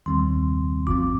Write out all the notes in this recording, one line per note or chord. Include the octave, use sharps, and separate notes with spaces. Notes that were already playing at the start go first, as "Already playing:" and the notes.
D#2 D#3 G3 C4 C6
G1 G2 F3 C4 D6